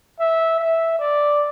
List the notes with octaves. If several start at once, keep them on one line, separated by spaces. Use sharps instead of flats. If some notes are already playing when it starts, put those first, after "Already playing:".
E5
E5
D5